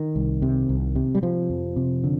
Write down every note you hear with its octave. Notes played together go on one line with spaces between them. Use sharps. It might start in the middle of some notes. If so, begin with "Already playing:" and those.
Already playing: D#3
C2
C3
C2
C3
G3
C3 F3
F2
C3
D3